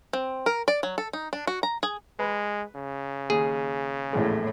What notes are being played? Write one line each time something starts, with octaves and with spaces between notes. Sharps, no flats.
C4
A#4
D5
F#3
A4
D#4
D4
F#4
A#5
G#4
G#3 B4 B5
C#3
D#2 G#4
A#1 E2 A2 G#3